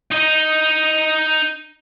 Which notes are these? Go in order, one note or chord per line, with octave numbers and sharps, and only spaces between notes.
D#4 D#5